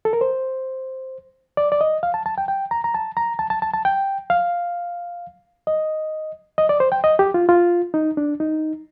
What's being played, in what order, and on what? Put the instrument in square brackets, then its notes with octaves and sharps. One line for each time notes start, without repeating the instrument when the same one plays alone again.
[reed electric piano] A4
A#4
C5
D5
D5
D#5
F5
A5
A5
G5
G5
A#5
A#5
A5
A#5
A5
A5
A5
A5
G5
F5
D#5
D#5
D5
C5
G5
D#5
G4
F4
F4
D#4
D4
D#4